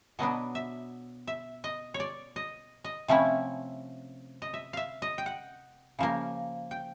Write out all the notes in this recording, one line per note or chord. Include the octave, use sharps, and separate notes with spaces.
B2 F#3 B3 D4 D#5
E5
E5
D#5
C#5
D5
D#5
D#5
C3 F3 A3 C#4 E4
D#5
E5
E5 F5
D#5
G5
F#5
C#3 F3 A#3
G5